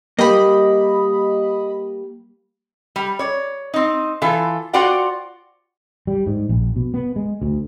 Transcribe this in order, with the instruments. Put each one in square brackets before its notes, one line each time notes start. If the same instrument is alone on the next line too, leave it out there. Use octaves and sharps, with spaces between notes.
[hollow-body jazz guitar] G3 A#3 [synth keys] D#5 B5
[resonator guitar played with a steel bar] G3
C#5 D5
C4 D#4
E3 F4 A4
F4 F#4 C5 D5 F#5 G5
[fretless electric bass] G3
G#2
A#1
B2
B3
G#3
D2